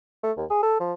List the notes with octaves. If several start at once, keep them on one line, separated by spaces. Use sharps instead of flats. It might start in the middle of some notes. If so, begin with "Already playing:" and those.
A3
D#2
G#4
A4
F3